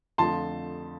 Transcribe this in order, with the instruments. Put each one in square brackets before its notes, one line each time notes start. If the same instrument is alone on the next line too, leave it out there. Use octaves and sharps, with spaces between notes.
[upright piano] F2 D3 F3 A3 A5 C6